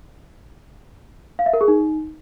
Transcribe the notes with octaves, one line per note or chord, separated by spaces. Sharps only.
F5
E5
A#4
G#4
D#4